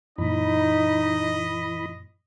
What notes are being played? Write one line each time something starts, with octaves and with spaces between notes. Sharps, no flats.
F#2 A#2 E3 D#4 D#5 B5